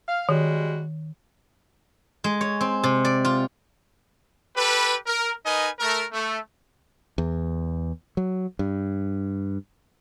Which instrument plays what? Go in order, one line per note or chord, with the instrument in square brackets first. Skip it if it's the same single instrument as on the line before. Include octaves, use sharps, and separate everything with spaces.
[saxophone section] F5
[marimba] D#3 [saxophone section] G3 G#3 F#4
[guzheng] G#3
C#5
C4
C3
D5
F4
[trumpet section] G4 A4 B4
A#4
D#4 A#4 B4 D#5 G#5
A3 A#4
A3
[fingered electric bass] E2
F#3
G2